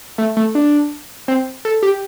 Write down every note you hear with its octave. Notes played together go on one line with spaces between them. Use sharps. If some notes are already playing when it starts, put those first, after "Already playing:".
A3
A3
D4
C4
A4
G4